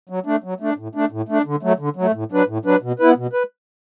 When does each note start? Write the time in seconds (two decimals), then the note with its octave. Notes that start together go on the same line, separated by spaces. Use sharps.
0.09 F#3
0.26 A3 D4
0.44 F#3
0.60 A3 D4
0.78 A2
0.95 A3 D4
1.12 A2
1.28 A3 D4
1.46 D3
1.63 F#3 A3
1.79 D3
1.96 F#3
2.02 A3
2.14 A2
2.32 F#3 D4 B4
2.48 A2
2.65 F#3 D4 B4
2.82 B2
2.99 B3 E4 B4
3.17 B2
3.33 B4